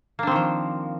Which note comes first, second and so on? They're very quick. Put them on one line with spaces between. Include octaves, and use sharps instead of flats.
A#3 D4 C4 D#3 F3